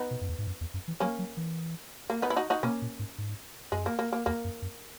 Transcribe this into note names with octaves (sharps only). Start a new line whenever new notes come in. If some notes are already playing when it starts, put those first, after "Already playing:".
Already playing: B3 D#4
B2
F#2
E2
G#2
F#2
E2
F#2
E3
F#3 A#3 C#4
F#3
E3
A#3
B3 D#4
E4
D#4 F#4
D#4 F#4
B2 A#3 C#4
A#2
G#2
G#2
F#2 G#3
A#3
A#3
A#3
E2 A#3
F#2
F#2